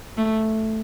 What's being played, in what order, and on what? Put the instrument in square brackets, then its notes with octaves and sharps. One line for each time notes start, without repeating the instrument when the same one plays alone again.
[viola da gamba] A3